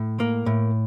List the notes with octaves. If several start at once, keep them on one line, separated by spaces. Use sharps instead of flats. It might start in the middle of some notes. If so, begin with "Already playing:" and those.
Already playing: A2
A#3
A2